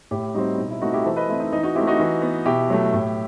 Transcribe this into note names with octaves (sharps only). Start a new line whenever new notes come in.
A2 E4 G4
G3 C4 D#4 F#4
B2 D#4
E4
A3 C4 D#4 F#4
E4 G4
E3 A4 C5
B4 D#5
A3 C4 E4
D#4
E3 D#4
D#4 F#4
A3 C4 E4 G4
D#4 F#4
E3
B3
B2 E4 G4
F#3 A3
A2